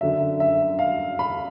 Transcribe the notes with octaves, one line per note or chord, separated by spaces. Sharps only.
F#2 D3 F#3 E5
E5
F5
B5